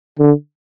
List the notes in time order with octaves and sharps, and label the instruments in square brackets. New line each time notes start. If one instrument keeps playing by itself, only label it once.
[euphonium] D3